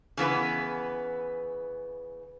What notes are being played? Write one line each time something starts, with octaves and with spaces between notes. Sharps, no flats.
C#3 E3 B3 B4